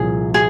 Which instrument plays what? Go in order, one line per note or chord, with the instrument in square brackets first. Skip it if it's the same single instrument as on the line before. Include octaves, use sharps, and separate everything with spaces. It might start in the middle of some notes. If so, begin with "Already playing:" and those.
Already playing: [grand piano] C2 A#2 F3 [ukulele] G#4
[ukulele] G#4